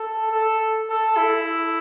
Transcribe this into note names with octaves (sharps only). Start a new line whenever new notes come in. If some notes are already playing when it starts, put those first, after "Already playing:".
Already playing: A4
A4
A4
E4